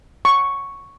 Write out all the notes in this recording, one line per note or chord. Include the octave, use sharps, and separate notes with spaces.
C#6